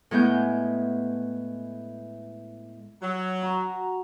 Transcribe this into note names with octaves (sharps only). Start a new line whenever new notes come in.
A2 G#3 B3 G6
F#3
F#4 A#5